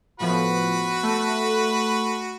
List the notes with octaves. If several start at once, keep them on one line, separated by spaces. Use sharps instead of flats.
A2 F3 B3 F#4 B4
A3